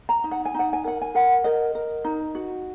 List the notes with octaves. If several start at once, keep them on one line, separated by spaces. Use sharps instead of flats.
A#5
D#4
F#5
G#5
D#4 F#5
G#5
A#4 F#5
G#5
A#4 F#5
A#4 D#5
A#4
D#4
F#4